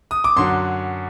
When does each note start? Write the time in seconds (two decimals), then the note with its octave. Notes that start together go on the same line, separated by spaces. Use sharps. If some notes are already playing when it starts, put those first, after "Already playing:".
0.11 D#6
0.24 D6
0.36 F#2 D3 F#3 C6